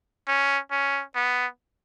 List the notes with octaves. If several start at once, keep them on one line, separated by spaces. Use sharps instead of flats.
C#4
C#4
B3